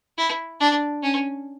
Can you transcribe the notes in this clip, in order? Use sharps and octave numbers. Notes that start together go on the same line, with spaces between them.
E4
D4
C#4